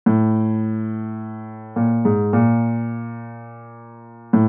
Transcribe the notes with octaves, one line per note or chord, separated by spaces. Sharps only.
A2
A#2
G#2
A#2
A2